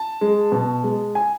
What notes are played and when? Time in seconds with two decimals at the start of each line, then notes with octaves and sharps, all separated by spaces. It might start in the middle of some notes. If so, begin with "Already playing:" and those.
Already playing: A5
0.21 G#3
0.52 B2
0.84 G#3
1.15 G#5